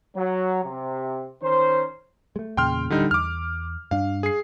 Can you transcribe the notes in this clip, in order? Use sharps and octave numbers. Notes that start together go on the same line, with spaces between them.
F#3
C3
D#3 C#4 A#4 C5
G#3 A3
E2 A#2 C#3 G5 C6 F6
D1 D3 G3 D#4
E2 D6 F6
G2 D4 F5
G#4 C7